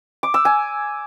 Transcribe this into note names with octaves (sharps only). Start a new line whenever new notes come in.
D6
E6
G#5